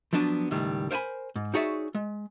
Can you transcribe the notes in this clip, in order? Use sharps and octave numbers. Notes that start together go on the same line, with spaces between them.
F3 F#3 B3 D4
C#2 A2 D#3 G3
A#4 C5 G5 G#5 B5
G#2
D#4 F#4 G#4 C#5 D5 E5
G#3